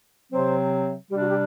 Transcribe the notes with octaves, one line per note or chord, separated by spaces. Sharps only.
C3 F#3 C4 C5
C3 G3 D4 G4
F#4
G4